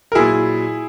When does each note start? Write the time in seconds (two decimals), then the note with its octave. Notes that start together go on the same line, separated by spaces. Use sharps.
0.12 A#4
0.15 A#2 F#3 E4 G#4